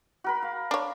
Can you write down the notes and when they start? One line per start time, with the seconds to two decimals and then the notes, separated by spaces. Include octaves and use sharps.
0.24 F#4 A#4 B5
0.43 F5
0.71 D4 C#5